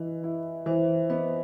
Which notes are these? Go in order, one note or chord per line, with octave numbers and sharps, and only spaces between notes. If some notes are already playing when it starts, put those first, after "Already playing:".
Already playing: E3 B4 D#5
E4
E3 C5 E5
B3 B4 D#5